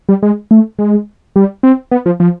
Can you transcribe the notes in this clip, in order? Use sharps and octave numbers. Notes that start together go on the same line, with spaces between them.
G3
G#3
A3
G#3
G3
C4
B3
F3
F3